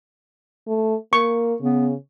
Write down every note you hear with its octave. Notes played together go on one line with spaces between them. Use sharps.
A3
A#3 C#6
C#3 B3